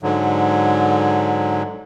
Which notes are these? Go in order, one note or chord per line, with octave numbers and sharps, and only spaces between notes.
G#2 D3 F#3